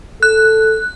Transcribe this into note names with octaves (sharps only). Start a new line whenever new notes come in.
A4 F#6